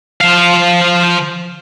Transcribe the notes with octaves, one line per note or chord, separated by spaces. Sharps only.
F3 F5